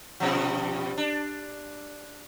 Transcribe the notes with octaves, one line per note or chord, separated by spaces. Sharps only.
G2 B2 F3
D4